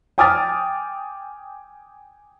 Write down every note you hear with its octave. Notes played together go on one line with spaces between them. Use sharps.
G5 G#5 D6 D#6 F6 A6